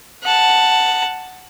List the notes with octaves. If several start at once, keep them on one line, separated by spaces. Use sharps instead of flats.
F#5 A5